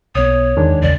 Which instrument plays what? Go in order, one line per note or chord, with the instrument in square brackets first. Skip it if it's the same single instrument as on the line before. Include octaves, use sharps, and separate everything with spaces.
[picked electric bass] B1 B3 [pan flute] C#5 [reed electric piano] D#6
[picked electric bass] E2 [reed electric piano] D#3 G#3 D4
[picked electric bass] A1 E2 C#3 [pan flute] D5